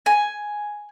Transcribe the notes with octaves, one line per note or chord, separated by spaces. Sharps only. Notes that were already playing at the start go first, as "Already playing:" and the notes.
G#5